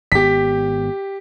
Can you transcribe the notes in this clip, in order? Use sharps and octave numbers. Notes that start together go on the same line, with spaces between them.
G#1 B3 G4 B6